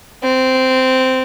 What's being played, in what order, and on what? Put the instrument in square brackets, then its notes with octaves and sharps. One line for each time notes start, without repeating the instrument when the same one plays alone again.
[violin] C4